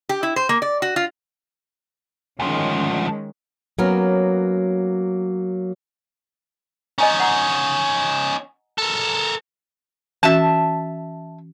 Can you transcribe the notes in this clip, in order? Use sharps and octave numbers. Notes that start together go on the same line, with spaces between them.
G4
E4
C5
A#3
D5
F#4
F4
D2 D#3 F3 G#3 C#4
F#3 A#3 B3 C#4 A#4
C#4 D#4 D#5 G#5 A#5
F#5 A#5 D#6
A4 A#4
E3 C#4 F#4 E5 A5